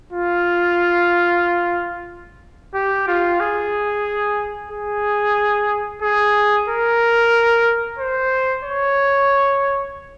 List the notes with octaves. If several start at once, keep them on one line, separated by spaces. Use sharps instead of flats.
F4
G4
F4
G#4
G#4
G#4
A#4
C5
C#5